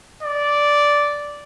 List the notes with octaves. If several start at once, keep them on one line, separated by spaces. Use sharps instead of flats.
D5